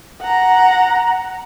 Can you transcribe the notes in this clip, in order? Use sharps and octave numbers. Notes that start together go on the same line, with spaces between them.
F#5 A#5